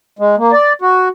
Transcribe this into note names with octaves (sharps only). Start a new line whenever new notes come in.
G#3
A#3
D5
F#4